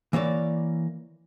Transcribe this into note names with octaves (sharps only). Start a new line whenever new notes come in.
E3 A#3 C#5 D5